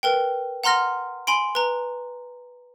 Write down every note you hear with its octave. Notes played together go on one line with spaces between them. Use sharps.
A#4 B4 G5
F#5 A#5 C6 F6 A#6
G#5 B5 C6 D7
B4 A#5